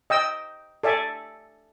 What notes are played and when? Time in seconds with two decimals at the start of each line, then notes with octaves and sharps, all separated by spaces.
0.10 D#5 G5 E6
0.83 A4 D5 E5 G#5